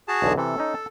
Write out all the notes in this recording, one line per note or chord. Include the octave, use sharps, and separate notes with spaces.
F#4 G#4 A5
B1 E2 D3
C3 E3 A4
C#4 D#4
A5